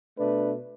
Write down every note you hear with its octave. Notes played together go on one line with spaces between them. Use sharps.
B2 A3 D4 B4